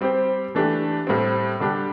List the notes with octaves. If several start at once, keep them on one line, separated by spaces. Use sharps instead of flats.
G3 C4 G4 C5
E3 A3 D4 G4
A2 G3 C4
D3 G3 D4 G4